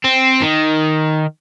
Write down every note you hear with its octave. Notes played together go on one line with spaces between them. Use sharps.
C4
D#3